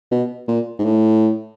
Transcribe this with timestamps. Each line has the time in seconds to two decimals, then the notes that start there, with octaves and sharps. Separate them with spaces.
0.12 B2
0.48 A#2
0.79 G#2
0.85 A2